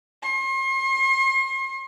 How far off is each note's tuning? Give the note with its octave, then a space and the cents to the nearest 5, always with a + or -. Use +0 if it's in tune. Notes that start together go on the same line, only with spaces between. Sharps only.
C6 +40